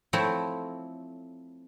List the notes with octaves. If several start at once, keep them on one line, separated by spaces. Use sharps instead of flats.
F3 A3 C4 E4 C#5